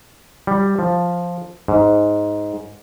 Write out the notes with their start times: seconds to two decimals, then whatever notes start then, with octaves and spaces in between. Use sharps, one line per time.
0.47 G3
0.79 F3
1.68 G#2